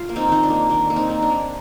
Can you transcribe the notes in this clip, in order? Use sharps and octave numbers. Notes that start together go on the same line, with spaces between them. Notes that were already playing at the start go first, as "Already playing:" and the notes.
Already playing: F4
A#3
C4 D#4
D#3 D#4
D4
A#3
D#3 D4
A#3
C4 D#4
A#3
D4
A#3